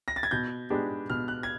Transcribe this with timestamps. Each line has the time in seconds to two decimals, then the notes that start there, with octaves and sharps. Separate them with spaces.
0.08 A#6
0.16 A6
0.23 G#6
0.31 B2 G6
0.70 G#3 B3 D4 G4
1.10 B2 F6
1.28 F#6
1.43 G#6